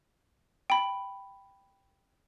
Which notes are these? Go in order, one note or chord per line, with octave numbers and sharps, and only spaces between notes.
G5 B5